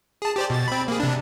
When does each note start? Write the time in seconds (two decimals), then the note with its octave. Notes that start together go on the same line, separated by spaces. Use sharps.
0.22 G#4 A5
0.36 G4 C5 D5
0.50 B2 A6
0.68 C4 B5
0.88 A#3 G#4
1.00 C3 D4